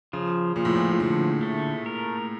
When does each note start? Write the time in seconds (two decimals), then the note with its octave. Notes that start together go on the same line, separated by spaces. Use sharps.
0.13 C#3 F3
0.56 A#2 F3
0.65 A2
0.75 A#2
0.91 A#2
1.00 A2 D3
1.43 A3
1.86 A#4